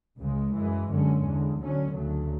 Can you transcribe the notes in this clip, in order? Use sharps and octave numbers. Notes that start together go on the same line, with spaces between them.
C#2 C#3 G#3
F#2 E3 G#3
F#2 D3 G#3 C#4
E2 D3 G#3
D2 D3 F#3 C#4
D2 C#3 F#3 A3